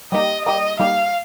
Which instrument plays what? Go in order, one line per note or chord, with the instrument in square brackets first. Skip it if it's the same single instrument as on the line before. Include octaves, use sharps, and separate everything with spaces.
[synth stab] G3 A#3 D#4 G4 [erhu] D#5
[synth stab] G3 A#3 D#4 G4 [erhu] D#5
[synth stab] G3 A#3 D#4 G4 [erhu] F5